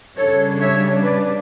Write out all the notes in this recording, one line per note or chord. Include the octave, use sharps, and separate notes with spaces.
C#3 G3 D4 A4 C#5
C#5 E5
B4 D5